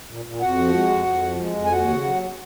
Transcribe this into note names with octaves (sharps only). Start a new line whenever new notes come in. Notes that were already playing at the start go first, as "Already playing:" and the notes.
A#2
A#2
F2 F#4 F#5
F3
G#3
F2
F2
F3
G#3
F2
G#5
D#2 F#4 F#5
C#3
F#3